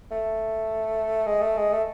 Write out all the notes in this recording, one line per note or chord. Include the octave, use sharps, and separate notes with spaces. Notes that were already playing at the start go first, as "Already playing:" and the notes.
A3
G#3
A3
G#3
A3